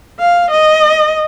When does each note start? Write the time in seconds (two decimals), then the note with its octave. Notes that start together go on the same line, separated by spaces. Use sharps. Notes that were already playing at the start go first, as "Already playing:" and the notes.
0.19 F5
0.50 D#5